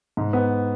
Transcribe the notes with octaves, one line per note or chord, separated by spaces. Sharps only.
G#2
B3